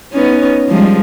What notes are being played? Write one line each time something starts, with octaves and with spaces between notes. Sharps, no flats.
B3 C#4 D#4
F3 G3 G#3